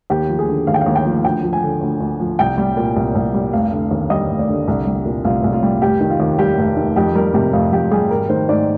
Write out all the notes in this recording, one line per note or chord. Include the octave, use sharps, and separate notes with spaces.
D#2 G4
F3
G#4
D3
D#2 F5
G5
F5
D#2
G5
F3
D2 G5
F3
G#5
D3
D2
D2
F3
C2 G5
G3
A#2
C2
C2
G3
F1 F5
D3
D#2
G3 D#5
F1
D5
D3
C2
G3
A#2
C2 F4
C2
F4
G3
F1 G4
D#3
F4
D#2
G3 G4
F1
D#3
F2 G4
G3 A#4
C3 G4
F2 F4
F2 G4
G3 G#4
G#1 A#4
D#3 C5
G#2 D5